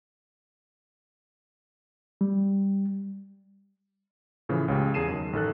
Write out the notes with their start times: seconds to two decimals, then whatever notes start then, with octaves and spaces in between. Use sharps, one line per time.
2.21 G3
4.49 A2 C#3 E3 F3
4.68 C#2 C#3 G4
4.94 E2 G#4 A5 C7 D#7 E7
5.08 F#2 D#3
5.33 A1 D#3 A4 F#6